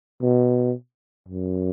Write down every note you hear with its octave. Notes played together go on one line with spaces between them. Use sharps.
B2
F#2